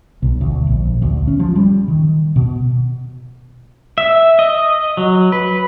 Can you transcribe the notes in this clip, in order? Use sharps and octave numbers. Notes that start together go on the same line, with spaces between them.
B1
D2
A#1
D2
C#4
F3
G3
D#3
B2
E5
D#5
F#3
B4